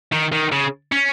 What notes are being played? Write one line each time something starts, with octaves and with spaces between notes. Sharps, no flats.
D#3
D#3
C#3
C#4